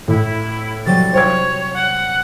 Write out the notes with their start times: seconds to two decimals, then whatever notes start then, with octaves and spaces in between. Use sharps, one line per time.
0.08 A2 E4
0.86 C3 F#3 G3 A6
1.13 C5 C#5 G5 G#6
1.74 F#5